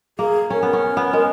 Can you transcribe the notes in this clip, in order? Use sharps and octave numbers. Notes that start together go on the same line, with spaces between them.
A#3 G#4
C#4 A#4
B3
C#4
B3
G#3